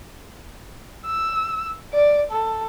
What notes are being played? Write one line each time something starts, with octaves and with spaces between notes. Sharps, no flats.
E6
D5
A4